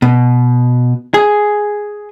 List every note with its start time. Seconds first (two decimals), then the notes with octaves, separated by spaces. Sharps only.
0.02 B2
1.14 G#4